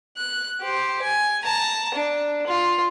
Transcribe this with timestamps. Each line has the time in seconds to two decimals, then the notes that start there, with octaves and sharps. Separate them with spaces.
0.17 F#6
0.61 G4 C5
1.02 G#5
1.44 A5 A#5
1.95 D4
2.47 F4